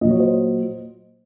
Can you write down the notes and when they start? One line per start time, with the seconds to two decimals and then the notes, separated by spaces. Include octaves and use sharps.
0.01 A#2 F#3 D#5
0.10 C#5
0.19 C5 D#5